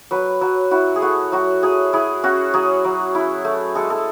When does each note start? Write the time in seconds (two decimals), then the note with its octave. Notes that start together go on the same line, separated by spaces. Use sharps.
0.11 F#3 B4
0.41 F#3
0.71 E4 F#4
0.96 G#4
1.02 A3 F#4
1.32 F#3 F#4
1.63 F#3 G#4
1.93 E4 G#4
2.23 C#4 F#4
2.54 F#3 G#4
2.84 F#3
3.15 E4
3.45 A3
3.75 G#3 A4
3.90 A4